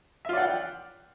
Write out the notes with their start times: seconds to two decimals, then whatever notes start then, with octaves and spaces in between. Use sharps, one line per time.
0.25 E5
0.29 F4
0.33 D5
0.38 F#5
0.42 G5